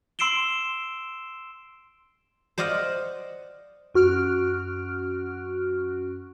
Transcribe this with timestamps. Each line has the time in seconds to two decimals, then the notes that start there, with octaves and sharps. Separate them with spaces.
0.19 C6 E6 C7 D7 E7 G7
2.58 C5 D5 D#5 F5 F#5
3.94 F#2 F#4 F6 D7